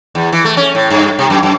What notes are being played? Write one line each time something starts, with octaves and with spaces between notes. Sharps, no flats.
E2
E3
A3
C#4
A2
G2
C3
F#2
F#2